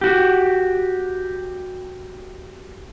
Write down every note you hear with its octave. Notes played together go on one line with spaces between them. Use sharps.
F#4 G4